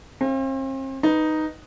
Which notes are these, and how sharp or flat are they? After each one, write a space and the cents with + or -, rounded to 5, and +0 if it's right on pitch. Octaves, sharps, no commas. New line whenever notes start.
C4 +40 F5 -20
D#4 +0 B4 +0